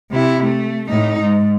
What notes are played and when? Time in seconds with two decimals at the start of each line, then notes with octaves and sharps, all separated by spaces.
0.12 C3 E4
0.44 A3
0.89 A2 D#4
1.21 G#2